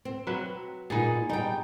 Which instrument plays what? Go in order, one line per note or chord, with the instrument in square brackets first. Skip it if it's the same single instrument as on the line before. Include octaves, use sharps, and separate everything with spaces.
[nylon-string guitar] C4
[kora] F#3 B4 E5
[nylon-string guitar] A#2 D#4 [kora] B3 G#4
[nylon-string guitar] G3 G5 [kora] D#4